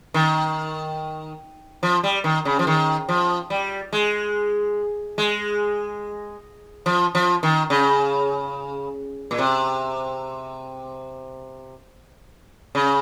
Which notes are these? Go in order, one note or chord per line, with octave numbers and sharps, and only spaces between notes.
D#3
F3
G3
D#3
C#3
F3
D#3
F3
G3
G#3
G#3
F3
F3
D#3
C#3
A#2
C3
C#3